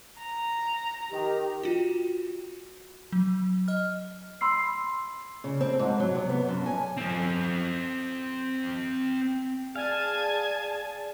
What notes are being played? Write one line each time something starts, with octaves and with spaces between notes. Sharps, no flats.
A#5
D#3 G4
F4 F#4
F#3
D#5 F6
B5 C6 E6 C7
C#3
C4
G#2
F#3
C3
B3
F#2
G#5
C4 A4
G#4 D5 F5 G#5 A5